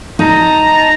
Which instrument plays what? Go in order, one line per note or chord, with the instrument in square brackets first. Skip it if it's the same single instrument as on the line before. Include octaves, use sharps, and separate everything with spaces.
[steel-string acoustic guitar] D#4 [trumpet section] A5 A#5